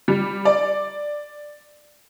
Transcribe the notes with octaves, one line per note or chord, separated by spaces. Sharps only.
G3
D5